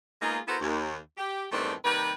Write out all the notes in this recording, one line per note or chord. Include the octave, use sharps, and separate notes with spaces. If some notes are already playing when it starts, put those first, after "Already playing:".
G#3 A#3 B3 D#4 F4 G#4
B3 E4 F#4 A4 A#4 C5
D#2
G4
E2 G2 D#3 A3 C4 D4
C3 D#3 G3 A#3 B4